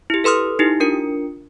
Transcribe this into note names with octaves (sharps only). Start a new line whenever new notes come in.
E4 G4
A4 B4 C6 D#6 F6
D#4 E4 G4
D4 F4 A#4 C#7